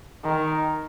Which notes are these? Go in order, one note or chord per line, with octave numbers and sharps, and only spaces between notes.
D#3